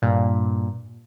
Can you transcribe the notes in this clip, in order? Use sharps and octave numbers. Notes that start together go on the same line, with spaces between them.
G2 A#2